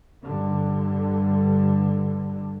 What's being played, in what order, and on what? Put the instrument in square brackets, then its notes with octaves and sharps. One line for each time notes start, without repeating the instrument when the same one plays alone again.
[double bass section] G2 D3